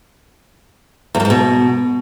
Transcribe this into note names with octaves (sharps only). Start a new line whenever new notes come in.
E2
F#2
G#2
B2